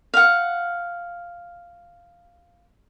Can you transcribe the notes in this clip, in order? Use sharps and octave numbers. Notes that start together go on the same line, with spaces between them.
F5 F#5